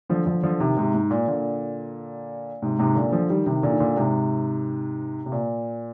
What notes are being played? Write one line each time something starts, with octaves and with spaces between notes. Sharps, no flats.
D3 F3
D3 F3
D3 F3
C3 D#3
G#2 C3
G#2
A#2
A#2 D3
G#2 C3
G#2 C3
A#2 D3
D3 F3
D#3 G3
C3 D#3
A#2 D3
D#3
A#2 D3
G#2 C3
C3
A#2